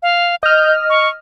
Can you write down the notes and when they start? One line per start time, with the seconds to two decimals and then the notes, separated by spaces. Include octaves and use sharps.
0.03 F5
0.43 D#5 F6 G6
0.90 C#6